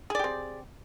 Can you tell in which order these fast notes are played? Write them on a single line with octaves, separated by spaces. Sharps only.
G#4 D5 G4 C4